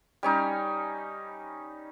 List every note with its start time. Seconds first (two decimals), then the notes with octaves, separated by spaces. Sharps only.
0.23 G3 C#4 D#4